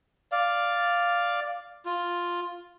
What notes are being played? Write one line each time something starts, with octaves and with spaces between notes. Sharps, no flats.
D5 F5
F4